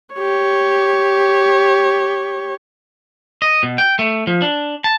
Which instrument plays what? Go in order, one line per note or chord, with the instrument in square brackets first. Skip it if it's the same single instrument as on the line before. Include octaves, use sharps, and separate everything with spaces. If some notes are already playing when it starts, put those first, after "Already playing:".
[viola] G4 C#5
[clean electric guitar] D#5
B2
G5
A3
F3
D4
A5